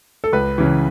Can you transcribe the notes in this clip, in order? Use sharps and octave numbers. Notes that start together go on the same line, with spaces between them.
A4
C#2 B4
C#3 E3